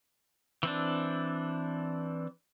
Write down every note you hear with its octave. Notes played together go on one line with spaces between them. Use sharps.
E3 C4 D4